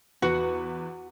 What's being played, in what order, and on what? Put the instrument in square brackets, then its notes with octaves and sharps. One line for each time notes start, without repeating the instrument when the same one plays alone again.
[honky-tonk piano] E2 B4 [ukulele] F#4